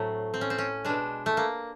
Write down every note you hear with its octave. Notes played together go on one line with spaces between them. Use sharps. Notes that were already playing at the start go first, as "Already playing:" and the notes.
Already playing: A2 F#3 A3 C4
C4
C#4
C4
C#4
B2 G#3 D4
A3
A#3